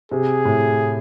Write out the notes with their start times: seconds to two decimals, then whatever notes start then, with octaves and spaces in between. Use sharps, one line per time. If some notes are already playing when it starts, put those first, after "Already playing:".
0.11 C3 G#4
0.45 A2